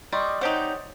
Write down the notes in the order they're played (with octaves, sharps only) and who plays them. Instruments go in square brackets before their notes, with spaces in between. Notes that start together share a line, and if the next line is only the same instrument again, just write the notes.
[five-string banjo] G3 [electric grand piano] D5 C6 C#6 [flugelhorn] D#5
[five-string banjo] F#3 G4 F#5 [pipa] C4 D#4 [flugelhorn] C#5